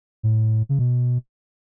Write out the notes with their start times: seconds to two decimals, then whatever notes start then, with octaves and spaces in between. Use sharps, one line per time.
0.23 A2
0.69 C#3
0.79 B2